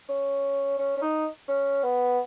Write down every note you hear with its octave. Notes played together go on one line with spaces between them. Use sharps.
C#4
C#4
C#4
D#4
C#4
B3